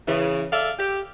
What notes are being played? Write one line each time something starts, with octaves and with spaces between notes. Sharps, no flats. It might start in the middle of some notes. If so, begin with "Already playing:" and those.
C#3 E3
A4 D5 E5 F5
G4